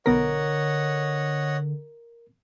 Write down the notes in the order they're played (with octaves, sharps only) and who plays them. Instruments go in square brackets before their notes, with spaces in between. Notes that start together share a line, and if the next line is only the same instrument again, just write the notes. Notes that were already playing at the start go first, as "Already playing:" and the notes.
[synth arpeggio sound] B1 B3 A#6 [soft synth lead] D3 [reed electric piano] A#4 [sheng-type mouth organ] C#5 D#5 F#5